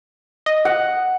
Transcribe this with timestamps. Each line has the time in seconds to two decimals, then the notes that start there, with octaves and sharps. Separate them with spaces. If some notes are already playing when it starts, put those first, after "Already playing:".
0.46 D#5
0.65 F#5